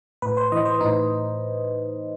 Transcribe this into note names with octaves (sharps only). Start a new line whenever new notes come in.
A2 B4
C5
E3 D#5
C5
A2 D#4